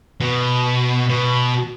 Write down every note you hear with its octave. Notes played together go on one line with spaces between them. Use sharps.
B2
B2